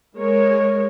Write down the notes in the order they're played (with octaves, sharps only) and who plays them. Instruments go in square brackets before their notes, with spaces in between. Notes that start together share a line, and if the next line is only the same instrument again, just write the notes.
[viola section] G#3 A#4 C#5